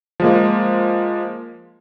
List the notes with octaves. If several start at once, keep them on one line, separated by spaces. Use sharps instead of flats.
F3 G#3 A#3